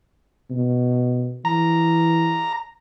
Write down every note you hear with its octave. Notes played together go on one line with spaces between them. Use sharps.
B2
E3 A#5